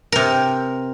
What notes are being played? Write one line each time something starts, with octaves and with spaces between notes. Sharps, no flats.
C3 A#4